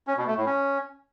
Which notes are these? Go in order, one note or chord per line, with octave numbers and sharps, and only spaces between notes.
C#4
B2
A3
A2
C#4